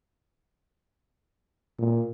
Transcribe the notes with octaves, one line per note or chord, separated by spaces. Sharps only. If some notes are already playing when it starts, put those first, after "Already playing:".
A#2